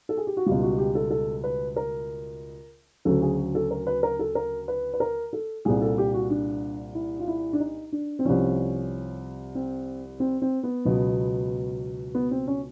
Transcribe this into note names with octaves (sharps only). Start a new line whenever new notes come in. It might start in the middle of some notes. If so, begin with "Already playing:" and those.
A4
G#4
G4
F#4
C#2 B2 G3 F4
F#4
G4
A4
A4
B4
A#4
D2 C#3 F#3 A4
G#4
A4
A#4
B4
A#4
A4
A#4
B4
B4
A#4
A4
C2 A#2 G3 G#4
A4
G4
F#4
D4
E4
F4
E4
D4
D#4
D4
C4
C2 C3 F3 C#4
C4
C4
C4
B3
C#2 B2 F#3
B3
C4
C#4